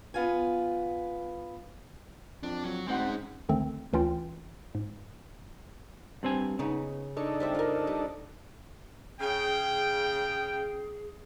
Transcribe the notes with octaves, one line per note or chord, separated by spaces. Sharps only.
B3 F4 G#5
F2 D4
F#3
D2 G#3 C4 D#4 C5 F#5
C#3
C#2 D3 D#3 A3 C4
D2 E3 C#4 F4 G5
G#2
G2 C4 G#5
C#3 B3 D#4
D4 D#4 A4 C#5
G3 C4 E5
F4 A#4
G3
C#3 G#4 G5